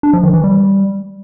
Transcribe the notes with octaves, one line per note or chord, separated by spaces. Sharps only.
D4
F3
D#3
E3
G3